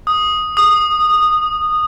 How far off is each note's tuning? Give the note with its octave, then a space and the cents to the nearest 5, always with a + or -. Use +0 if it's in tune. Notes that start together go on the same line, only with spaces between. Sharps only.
D#6 +0
D#6 -15